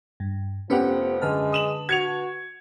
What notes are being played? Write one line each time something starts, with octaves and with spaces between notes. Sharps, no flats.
G2
F1 F3 B3 C#4 G4 B4 F#5
F#2 D3 G#3 B4 A5 F6
D#6 E7 F#7
F#4 G#6 C#7 F7